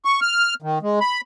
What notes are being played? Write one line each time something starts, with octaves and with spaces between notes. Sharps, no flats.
C#6
F6
D#3
G#3
B5